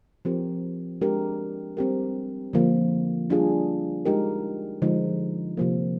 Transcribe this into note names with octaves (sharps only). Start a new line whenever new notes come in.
F3 C4 G4 A#4
G#3 D4 G4 A#4
G3 C4 G4 A#4
D3 F3 A#3
G3 D4 F4 G#4
G#3 D#4 G4 A#4
D3 F3 G#3 D#4
C3 F3 A#3